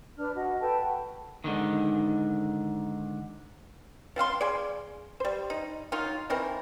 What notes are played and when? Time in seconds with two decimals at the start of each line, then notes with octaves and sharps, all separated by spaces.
0.18 D4 B4 F6
0.35 F#4 D#5
0.61 A4 B4 G5 A5
0.80 F#4
1.44 G#2 B2 D3 D#3
4.16 F3 C4 F5 C6
4.41 G#4 D5
5.20 G3 C5
5.50 D#4
5.92 D#3 F#3 D#4 F4
6.30 D#3 E3 C4 A#4